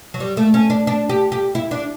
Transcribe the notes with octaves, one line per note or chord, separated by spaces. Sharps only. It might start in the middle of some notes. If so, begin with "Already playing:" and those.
F#3
G3
A3
C#4
D4
D4
G4
G4
E4
D4